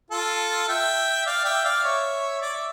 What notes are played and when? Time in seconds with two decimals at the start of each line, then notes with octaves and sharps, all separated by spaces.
0.11 F4 A4
0.68 E5 G5
1.26 D5 F5
1.45 E5 G5
1.65 D5 F5
1.83 C#5 E5
2.41 D5
2.53 E5